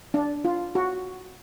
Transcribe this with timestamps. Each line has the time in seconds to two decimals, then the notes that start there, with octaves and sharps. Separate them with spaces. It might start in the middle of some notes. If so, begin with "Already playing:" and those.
0.14 D4
0.45 F4
0.75 F#4